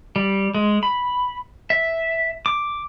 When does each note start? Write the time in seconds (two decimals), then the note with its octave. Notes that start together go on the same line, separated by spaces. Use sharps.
0.16 G3
0.55 G#3
0.83 B5
1.70 E5
2.46 D6